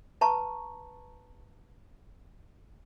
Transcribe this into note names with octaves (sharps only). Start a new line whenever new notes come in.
B4 A5 A#5 C#6